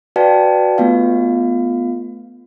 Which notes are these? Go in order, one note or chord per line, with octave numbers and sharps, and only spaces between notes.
F#4 B4 D5 F5 G5 A5
A3 B3 F4 F5